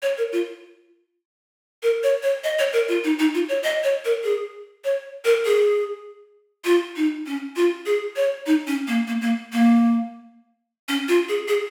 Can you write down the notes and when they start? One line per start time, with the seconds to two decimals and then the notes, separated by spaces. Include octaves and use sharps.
0.02 C#5
0.18 A#4
0.32 F4
1.83 A#4
2.03 C#5
2.22 C#5
2.44 D#5
2.59 C#5
2.73 A#4
2.88 F4
3.04 D#4
3.19 D#4
3.34 F4
3.49 C#5
3.63 D#5
3.83 C#5
4.05 A#4
4.24 G#4
4.84 C#5
5.25 A#4
5.45 G#4
6.65 F4
6.96 D#4
7.26 C#4
7.56 F4
7.86 G#4
8.16 C#5
8.46 D#4
8.67 C#4
8.87 A#3
9.07 A#3
9.21 A#3
9.53 A#3
10.88 C#4
11.08 F4
11.29 G#4
11.48 G#4